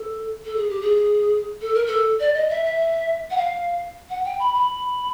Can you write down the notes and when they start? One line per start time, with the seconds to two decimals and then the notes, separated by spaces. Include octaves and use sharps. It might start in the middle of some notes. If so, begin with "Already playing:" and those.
Already playing: A4
0.45 A4
0.56 G#4
0.69 G4
0.81 G#4
1.61 A4
1.74 A#4
1.86 A4
2.20 D5
2.34 D#5
2.49 E5
2.64 E5
3.30 F#5
3.37 F5
4.09 F#5
4.24 G5
4.39 B5
4.54 B5